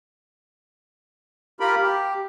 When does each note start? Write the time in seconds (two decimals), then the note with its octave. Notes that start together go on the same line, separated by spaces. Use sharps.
1.60 F4 G4 A#4 B5
1.82 G4